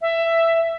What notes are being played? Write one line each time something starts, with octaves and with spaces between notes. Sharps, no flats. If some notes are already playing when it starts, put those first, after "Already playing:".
E5